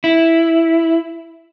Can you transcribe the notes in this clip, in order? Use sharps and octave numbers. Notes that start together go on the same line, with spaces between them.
E4